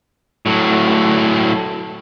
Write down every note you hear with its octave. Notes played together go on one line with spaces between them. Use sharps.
A2 F#3